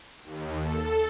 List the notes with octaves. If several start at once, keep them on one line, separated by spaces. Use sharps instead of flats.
D#2
A4